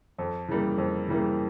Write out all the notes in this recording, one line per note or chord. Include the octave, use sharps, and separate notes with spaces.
F2 A4
C#3 E3 G3 A#3
F2
C#3 E3 G3 A#3